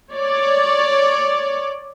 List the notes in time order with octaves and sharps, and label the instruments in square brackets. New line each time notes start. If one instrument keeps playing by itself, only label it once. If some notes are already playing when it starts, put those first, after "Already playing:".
[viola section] C#5 D5